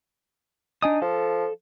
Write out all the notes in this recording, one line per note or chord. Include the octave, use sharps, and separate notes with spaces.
D4 D#4 G#5 D#6
F3 A4